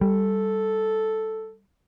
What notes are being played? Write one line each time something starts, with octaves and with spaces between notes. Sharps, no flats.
G3 A4